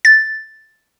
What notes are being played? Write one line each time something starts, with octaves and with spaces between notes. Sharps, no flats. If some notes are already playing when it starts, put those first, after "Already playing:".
A6